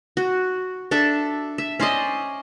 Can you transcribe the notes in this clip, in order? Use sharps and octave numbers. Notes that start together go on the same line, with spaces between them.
F#4
D4 A4 E5 A5
E5
C#4 C5 D5 D#5